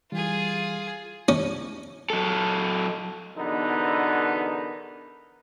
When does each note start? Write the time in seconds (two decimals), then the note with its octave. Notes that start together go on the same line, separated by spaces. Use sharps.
0.12 E3 G3 F4 G#4
1.29 C#4
2.10 F#3 A4
3.37 E2 B2 D3 B3 D#4 A#4